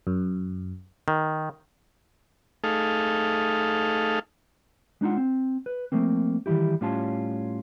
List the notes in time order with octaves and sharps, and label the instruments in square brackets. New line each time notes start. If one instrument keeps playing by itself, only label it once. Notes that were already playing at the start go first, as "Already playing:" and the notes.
[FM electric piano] F#2
[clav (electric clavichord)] D#3
[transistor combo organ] A3 D#4 G#4 A4 F5
[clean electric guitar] G#3 D4 D#4 F4 F#5
C4
B4
F3 A3 A#3 C4
D#3 E3 G3 E4 G4
A2 G3 C#4 F4 C#5 A5